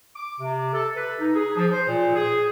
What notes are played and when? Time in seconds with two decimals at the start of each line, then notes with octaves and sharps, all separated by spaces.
0.16 D6
0.41 C3
0.74 A4
0.95 B4
1.21 D#4
1.35 G#4
1.57 F3
1.71 C5
1.88 A#2
2.15 G#4